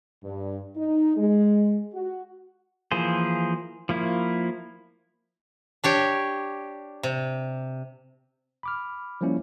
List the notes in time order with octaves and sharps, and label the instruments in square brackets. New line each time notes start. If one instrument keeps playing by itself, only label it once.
[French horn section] G2
D#4
G#3
F#4
[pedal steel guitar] E3 F3 A#3 G#4 C5
F3 A#3 E4
[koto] D4 G4 C#5
C3
[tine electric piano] B5 D6 F6
F3 G3 A#3 C#4 E4